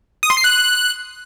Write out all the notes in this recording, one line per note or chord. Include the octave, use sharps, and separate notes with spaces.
D#6
C6
C7
F#6